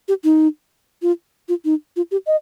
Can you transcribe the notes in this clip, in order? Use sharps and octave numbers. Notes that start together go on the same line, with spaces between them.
G4
D#4
F4
F4
D#4
F4
G4
D#5